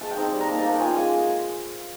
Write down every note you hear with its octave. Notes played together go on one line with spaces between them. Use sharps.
G#3 A5
G5
C4 D#4
G3
A#5
A#3 D#4 A5
A#3 A5 A#5
C#4 F4 G5 G#5
G#3 G#5